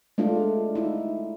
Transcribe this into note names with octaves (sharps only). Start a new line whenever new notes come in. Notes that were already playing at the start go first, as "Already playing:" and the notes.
G#3 A3 D4 F4
D#4 E4